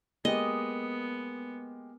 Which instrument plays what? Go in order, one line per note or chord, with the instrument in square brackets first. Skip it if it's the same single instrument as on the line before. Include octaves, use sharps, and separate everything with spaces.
[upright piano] G#3 A#3 G4 [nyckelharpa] B3 [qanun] D#5